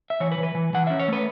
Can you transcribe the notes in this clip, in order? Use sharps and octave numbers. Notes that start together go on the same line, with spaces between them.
E5
E3 C#5
B4
E3
B4
E3
E3 F#5
C#4 E5
C#5
A3 B4